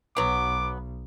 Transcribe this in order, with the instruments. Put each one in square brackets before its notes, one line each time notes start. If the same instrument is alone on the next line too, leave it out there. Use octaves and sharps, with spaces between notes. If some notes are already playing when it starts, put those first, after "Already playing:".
[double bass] B1 [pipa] F#3 B3 [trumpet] D6